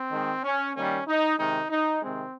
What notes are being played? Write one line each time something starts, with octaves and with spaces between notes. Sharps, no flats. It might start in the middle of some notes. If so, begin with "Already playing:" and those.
Already playing: C4
D#3 G#3
C#4
D#3 G3 A#3 C#4
D#4
C3 D#3 G#3 D#4
D#4
C3 D#3 G#3 C4